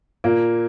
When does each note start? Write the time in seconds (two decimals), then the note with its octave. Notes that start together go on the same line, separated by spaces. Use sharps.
0.24 A#2 A#3